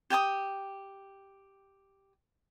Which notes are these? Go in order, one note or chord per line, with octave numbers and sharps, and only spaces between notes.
G4 G5 G#5 D#6